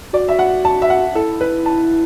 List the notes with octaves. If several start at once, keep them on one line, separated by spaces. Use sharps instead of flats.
F#4 D5
E5
F#5
A5
E5
F#5
E4 A4
B4
A5